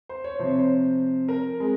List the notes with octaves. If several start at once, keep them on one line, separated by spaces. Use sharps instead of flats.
C5
C#5
C3 F3 C4 C5
C#5
C5
A#4
G#3 C4